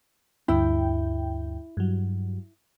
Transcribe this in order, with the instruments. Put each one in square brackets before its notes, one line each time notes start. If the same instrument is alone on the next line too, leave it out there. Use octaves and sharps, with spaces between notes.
[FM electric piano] D2 G2 G5 [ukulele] E4
[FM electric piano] G2 F#3